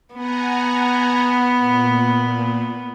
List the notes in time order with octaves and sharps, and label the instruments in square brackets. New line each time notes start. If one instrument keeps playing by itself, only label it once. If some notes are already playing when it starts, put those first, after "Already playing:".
[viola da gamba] B3 [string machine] F#5 G#5 A#5
[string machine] A#2